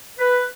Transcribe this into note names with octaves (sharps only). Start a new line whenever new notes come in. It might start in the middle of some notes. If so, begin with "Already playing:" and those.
B4